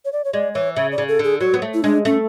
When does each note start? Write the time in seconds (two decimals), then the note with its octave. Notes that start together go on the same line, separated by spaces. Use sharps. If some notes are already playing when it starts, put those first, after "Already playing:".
0.05 C#5
0.13 D5
0.25 C#5
0.33 G#3 D5
0.54 E3 C#5
0.76 C#3 E5
0.92 D5
0.98 C#3
1.08 A4
1.19 D3 G#4
1.41 F#3 F#4
1.54 B3
1.62 A3
1.74 E4
1.83 G#3 D4
2.05 A3 C#4